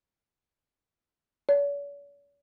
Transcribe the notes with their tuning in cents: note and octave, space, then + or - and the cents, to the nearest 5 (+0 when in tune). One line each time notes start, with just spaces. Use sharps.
C#5 +45